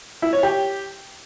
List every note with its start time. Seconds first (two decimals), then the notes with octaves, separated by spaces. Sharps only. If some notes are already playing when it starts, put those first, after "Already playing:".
0.22 E4
0.33 C#5
0.43 G4